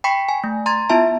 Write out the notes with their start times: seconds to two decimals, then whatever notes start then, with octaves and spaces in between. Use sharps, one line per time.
0.04 G5 B5 C#6 B6 C#7
0.29 G#5
0.44 A3
0.66 A#5 C6 G#6 A6
0.89 B3 E4 F4 E5 A5